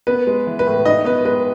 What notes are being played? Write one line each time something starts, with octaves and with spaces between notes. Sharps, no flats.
B3 B4
G#3
E3
B4
A2
D#4 D#5
B3 B4
G#3 B4